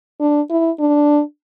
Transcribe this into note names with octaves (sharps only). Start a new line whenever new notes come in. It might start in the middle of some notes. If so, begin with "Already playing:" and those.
D4
E4
D4